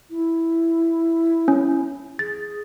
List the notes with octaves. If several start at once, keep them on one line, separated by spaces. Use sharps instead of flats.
E4
C#4
G#4 A6